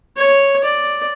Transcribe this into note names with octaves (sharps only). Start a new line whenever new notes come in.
C#5
D5